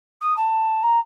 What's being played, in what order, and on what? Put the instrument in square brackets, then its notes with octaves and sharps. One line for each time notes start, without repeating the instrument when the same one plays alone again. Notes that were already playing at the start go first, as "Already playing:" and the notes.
[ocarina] D#6
A5
A#5